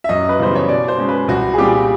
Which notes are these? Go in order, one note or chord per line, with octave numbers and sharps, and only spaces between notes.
E5
F#2 D#5
B4
C#3 E3 G3 B3 C5
C#5
B2 D5
C5
G#3 C#4
B4
C2 F#4
G#4
A#2 G3 C4 G4